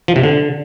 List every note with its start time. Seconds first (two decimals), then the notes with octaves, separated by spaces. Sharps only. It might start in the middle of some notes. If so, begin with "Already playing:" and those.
0.08 F3
0.16 C3
0.23 D3